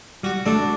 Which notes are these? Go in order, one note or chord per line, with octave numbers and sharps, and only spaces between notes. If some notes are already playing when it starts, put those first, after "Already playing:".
G3 F#4
A3 D4